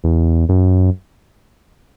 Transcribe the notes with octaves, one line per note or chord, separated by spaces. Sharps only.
E2
F#2